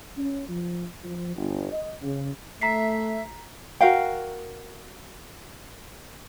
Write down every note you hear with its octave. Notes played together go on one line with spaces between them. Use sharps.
C#4
F3
F3
G1
D#5
C#3
A3 E5 A#5 B6 C7
F#4 A#4 F5 G5